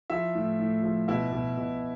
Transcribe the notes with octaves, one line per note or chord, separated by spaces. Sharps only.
F3 E4 E5
A2
A2
F3
B2 E4 E5
B2
B2